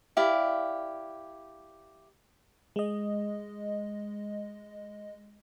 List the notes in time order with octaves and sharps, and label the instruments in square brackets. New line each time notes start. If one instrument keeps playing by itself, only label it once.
[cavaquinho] E4 G4 D5 F5
[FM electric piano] G#3 D#5